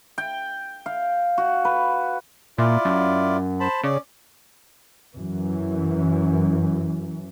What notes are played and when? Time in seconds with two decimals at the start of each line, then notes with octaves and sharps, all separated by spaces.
0.18 G5
0.86 F5
1.38 F#4
1.65 B4
2.58 A#2 E4 F4 D5
2.85 F#2
3.60 C5 A5 B5
3.84 C#3 C#4 D5
5.15 F#2 E3